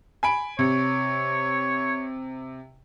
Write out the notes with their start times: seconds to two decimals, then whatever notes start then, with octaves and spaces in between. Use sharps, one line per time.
0.23 G#5 B5 D7
0.59 C3 C#5